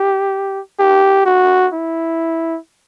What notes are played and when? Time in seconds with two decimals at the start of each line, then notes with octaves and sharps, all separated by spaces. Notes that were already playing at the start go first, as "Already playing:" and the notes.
Already playing: G4
0.79 G4
1.26 F#4
1.73 E4